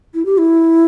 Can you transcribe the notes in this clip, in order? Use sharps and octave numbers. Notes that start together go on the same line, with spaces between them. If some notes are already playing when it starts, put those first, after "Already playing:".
E4
G4
E4